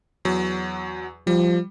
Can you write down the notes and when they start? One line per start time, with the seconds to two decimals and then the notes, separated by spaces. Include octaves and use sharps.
0.25 E2 F#3
1.27 F3 G3